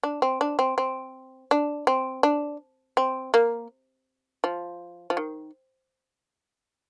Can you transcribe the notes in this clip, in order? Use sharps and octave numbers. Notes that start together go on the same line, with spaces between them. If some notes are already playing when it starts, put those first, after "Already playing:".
D4
C4
D4
C4
C4
D4
C4
D4
C4
A#3
F3
F3
D#3